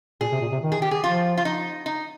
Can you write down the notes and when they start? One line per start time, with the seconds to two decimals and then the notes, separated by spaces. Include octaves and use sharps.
0.21 A#2 G#4
0.32 C3
0.42 A#2
0.52 C3
0.63 D#3
0.72 G#4
0.82 G4
0.91 G#4
1.03 F3 F4
1.37 F4
1.45 D#4
1.86 D#4